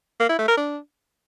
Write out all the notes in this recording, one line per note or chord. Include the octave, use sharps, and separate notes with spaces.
A#3
E4
A3
A#4
D4